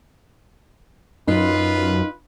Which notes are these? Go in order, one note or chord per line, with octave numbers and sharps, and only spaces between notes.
F#2 D#4 F4 B4